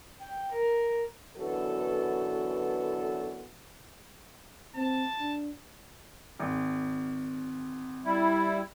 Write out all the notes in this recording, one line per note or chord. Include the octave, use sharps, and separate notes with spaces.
G5
A#4
F#2 D3 E3 B3 F#4 A4
C4 A5
D4
G#1
G3 E4